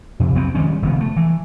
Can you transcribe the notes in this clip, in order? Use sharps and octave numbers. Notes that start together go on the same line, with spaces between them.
F2 C3
C2 F#3 B3 C4
D#3 G3 G#3 C#4
F1 D#3 B3
A3
E3